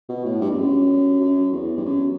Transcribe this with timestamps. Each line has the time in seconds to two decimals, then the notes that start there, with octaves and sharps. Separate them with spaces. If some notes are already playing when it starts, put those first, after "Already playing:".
0.09 B2
0.25 A2
0.41 G2
0.50 E2
0.58 F#2
1.20 F#2
1.52 E2
1.77 G2
1.85 F#2